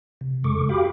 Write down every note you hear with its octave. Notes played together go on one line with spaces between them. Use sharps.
C3
F2 C#3 G#3 A4 C#6 D6
F#4 G4 F5 G5 B5 D6